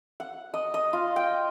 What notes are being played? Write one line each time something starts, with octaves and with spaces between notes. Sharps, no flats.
F#5
D#5
D#5
F4
G5